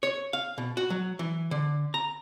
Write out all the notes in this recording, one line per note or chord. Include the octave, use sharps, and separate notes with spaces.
C#5
F5
B2
F#4
F#3
E3
D3
A#5